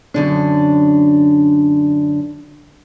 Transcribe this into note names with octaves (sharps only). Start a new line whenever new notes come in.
F#2 D3 D4